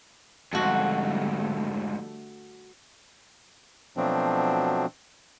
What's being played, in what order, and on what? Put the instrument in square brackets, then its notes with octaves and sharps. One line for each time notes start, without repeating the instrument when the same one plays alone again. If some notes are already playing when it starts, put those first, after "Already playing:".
[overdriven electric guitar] F2 G#2 [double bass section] D3 G3 A3 [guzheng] F#4 A4
[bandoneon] B2 F3 F#3 A3 C4 D4